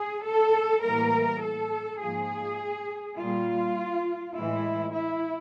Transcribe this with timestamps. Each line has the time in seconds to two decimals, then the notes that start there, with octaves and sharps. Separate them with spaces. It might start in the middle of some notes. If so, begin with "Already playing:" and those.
Already playing: G#4
0.25 A4
0.83 A2 E3 G3 A#3 A#4
1.43 A4
2.01 G#2 F3 A#3 G#4
3.18 A#2 G3 A#3 F4
4.36 A2 E3 G#3 E4
4.95 E4